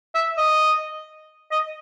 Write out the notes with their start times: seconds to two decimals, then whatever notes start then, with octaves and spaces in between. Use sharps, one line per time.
0.15 E5
0.38 D#5
1.51 D#5